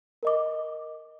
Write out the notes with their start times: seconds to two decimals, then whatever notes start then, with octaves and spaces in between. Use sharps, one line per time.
0.23 A#4 D#5 D6